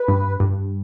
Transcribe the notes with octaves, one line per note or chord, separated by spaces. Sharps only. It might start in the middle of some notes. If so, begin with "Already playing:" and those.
Already playing: B4
G2
G2